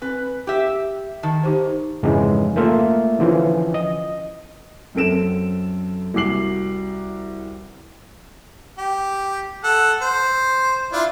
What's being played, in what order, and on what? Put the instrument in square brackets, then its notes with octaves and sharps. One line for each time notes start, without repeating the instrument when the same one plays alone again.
[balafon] C4 [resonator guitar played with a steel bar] B4
[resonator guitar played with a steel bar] G4 E5
[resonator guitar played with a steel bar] D#3 [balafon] A5
[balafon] D#4 G4 C5
[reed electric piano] F2 G#2 C#3 E3 G#3
A3 A#3 F4 E5
D3 E3 F3 C#4
D#5
[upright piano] F#2 C4 A4 D7 E7
C2 F#4 D6 C7 F#7
[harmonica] G4
A4 F#5
C5
D4 E4 F4